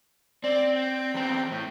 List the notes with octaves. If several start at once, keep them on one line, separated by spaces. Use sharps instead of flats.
C4 D5
G5
E2 C4
A2